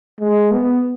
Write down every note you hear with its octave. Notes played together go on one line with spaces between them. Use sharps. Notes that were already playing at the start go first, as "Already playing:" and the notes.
G#3
B3